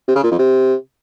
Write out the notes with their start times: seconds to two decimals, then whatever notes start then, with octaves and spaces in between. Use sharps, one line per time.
0.08 C3
0.16 C#3
0.24 A#2
0.31 F2
0.39 C3